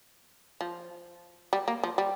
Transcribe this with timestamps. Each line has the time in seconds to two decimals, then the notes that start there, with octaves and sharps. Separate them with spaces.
0.61 F3
1.53 G3
1.68 A#3
1.83 F3
1.98 G3